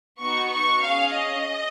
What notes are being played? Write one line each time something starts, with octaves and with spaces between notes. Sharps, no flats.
B3 D#4 F#4 C#6
C#6
C#4 G#4 F5
D#5